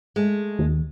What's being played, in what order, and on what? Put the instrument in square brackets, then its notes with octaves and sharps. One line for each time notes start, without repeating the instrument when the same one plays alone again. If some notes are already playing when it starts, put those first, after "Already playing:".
[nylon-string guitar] G#3 A3
[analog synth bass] D#2